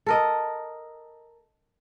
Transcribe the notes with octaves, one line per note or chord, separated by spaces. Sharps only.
A4 A#4 D#5